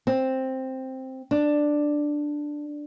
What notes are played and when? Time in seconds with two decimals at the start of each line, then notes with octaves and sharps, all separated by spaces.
0.07 C4
1.31 D4